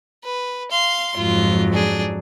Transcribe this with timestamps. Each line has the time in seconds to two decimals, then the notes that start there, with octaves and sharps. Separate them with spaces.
0.24 B4
0.71 F5 C6
1.16 F2 G#2 F#3 F4
1.73 D4 G#4